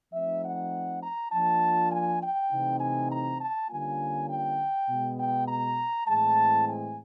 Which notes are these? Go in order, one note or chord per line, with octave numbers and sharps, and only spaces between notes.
F3 A3 C4 D#4 E5
F#5
A#5
F3 A#3 D4 F4 A5
G#5
G5
C3 E3 A3 C4 D#4
G#5
A#5
A5
D3 G3 A#3 C#4 F4 G#5
G5
B2 G#3 B3
G5
A#5
A2 E3 G#3 C4 A5
G#5